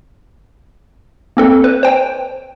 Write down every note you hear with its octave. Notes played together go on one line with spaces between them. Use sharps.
A#3 C4 A4
B4
C5 G5